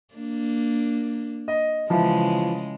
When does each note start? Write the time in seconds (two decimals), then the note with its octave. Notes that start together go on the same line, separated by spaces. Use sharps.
0.14 A#3 D4
1.48 D#5
1.90 C#3 E3 F3 G#3